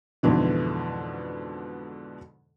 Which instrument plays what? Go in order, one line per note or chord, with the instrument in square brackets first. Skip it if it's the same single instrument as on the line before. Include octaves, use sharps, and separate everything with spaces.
[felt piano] F2 G#2 B2 D3 E3